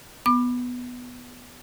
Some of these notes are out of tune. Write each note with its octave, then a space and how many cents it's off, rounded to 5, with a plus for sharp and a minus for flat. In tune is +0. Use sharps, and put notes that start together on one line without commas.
B3 +0 D6 +25